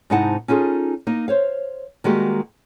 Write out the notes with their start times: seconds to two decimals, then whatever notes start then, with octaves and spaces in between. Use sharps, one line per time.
0.10 G#2 C3 D#4 E4 F#5 A5
0.48 C#4 D#4 F4 G#4 A4
1.07 A#3 D#4
1.28 C5 C#5 F5
2.04 D#3 G3 G#3 A#3 F#4 G4